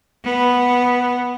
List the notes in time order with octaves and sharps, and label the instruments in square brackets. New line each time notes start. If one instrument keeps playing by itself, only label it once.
[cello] B3